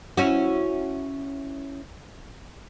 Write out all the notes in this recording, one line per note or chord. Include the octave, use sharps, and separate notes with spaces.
C#4 E4 F#4